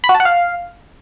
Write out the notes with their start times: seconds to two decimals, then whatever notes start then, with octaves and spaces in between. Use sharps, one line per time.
0.04 B5
0.09 F#4
0.15 A5
0.20 F#5
0.25 F5